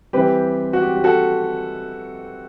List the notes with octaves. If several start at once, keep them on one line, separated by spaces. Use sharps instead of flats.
E3 G3 C4 G4 B4
F#4
G4
G4
F#4 A4